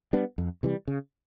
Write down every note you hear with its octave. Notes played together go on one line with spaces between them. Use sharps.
G3 B3 D4
F2
C3 E3 G3
C#3